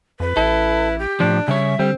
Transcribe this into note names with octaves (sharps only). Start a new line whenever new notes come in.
F2 B4
A1 E4 A4
G4
A2 F3 D4
C#3 G3 C#5 E5
D3 G3 C4